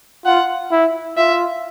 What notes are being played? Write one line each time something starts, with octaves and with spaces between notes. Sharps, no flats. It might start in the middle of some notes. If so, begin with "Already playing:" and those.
F4 F#5
E4
F4 E5